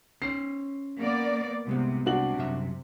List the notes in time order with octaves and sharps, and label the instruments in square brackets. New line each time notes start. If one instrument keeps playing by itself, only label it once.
[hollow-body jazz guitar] C#4 C5 [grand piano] C7
[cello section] A#3 B3 D5
[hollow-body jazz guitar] C2 G#3 B3 [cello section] C3
[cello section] C3 [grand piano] D4 F#4 F#7
[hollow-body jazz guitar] C2 F#2 E5